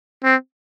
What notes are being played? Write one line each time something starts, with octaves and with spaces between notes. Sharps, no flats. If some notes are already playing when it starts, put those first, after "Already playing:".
C4